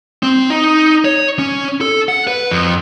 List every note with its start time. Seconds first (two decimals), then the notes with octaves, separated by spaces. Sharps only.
0.23 C4
0.50 D#4
1.05 C#5
1.39 C#4
1.81 A4
2.09 F#5
2.27 B4
2.51 F2